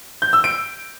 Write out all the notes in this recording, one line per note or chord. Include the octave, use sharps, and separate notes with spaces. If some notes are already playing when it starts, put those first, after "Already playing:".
G6
E6
D7